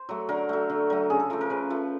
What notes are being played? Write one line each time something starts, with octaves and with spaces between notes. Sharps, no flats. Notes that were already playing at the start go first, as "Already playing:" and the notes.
Already playing: C5
F#3 A3
D3 A#4
F#3 A3
D3
F#3 A3
C#3 G#4
A4
F3 A3 A#4
A#4
C#3 B4
F3 A3